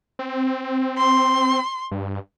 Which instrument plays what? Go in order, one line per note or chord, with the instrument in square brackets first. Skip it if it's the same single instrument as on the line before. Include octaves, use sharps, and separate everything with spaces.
[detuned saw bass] C4
[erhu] C6
[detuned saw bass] G2